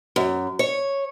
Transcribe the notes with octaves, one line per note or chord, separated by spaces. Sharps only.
F#2
C#5